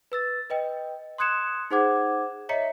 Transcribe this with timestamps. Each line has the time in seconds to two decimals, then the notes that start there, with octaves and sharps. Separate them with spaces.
0.12 B4 E6 A6
0.50 B4 D#5 G5
1.18 C6 D#6 F#6 G#6 C#7 E7
1.71 D#4 G#4 C5 F#5 D6 G#6
2.49 C#5 D#5 E5 A#5 B6 C#7